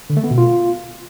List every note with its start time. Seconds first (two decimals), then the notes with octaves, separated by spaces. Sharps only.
0.10 D3
0.17 A3
0.24 B3
0.31 B2
0.38 F4